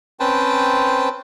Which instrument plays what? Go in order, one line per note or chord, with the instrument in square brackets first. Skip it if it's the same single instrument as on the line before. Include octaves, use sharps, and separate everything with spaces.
[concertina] C4 C#4 B4 C5 G5 A5